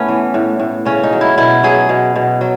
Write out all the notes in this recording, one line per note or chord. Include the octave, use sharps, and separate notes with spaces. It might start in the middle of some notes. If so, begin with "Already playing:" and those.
Already playing: A2 A3 B3 C#4
E3
A2
A2
C#3 C#4
D#4
F#3
E4
B2 E4
F#3 G#4
B2
B2
F#3